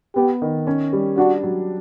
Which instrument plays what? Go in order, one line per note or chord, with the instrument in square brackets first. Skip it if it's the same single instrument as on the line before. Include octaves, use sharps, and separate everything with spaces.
[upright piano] B3 [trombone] G4
[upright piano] D#3
C#4
G3
[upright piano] D4 [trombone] F#4
[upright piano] F#3